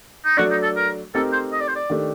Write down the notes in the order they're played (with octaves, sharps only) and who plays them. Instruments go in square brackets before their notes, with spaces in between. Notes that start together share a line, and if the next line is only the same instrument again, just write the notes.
[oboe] D#4
[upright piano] F#3 A3 D4 [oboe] F#4
[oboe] D#4
A4
A#4
[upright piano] A3 C4 D#4 G4 A#4 [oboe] A4
[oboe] C5
D#5
D5
C5
D5
[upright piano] D#3 A3 D4 G4